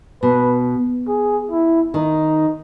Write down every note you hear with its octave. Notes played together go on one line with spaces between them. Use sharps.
B2 B4
G#4
E4
D#3 D#4